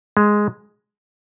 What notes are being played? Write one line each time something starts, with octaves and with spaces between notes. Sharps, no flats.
G#3